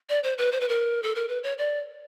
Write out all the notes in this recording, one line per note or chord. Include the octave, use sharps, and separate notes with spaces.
D5
C5
B4
C5
B4
A#4
A4
A#4
B4
C#5
D5